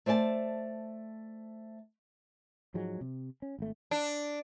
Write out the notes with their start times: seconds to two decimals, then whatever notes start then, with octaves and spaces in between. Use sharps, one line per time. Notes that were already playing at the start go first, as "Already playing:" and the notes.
0.06 A3 C5 D5 G#5 A5
2.74 G#2 F3 F#3 G#3
3.01 C3
3.42 C#4
3.59 G#1 A3
3.91 D4